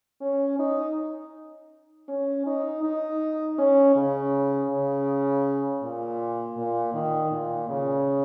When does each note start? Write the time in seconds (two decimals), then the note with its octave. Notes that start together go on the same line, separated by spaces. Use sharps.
0.21 C#4
0.59 D#4
2.08 C#4
2.46 D#4
2.83 D#4
3.58 C#4
3.96 C#3
4.71 C#3
5.83 A#2
6.57 A#2
6.94 D#3
7.31 A#2
7.69 C#3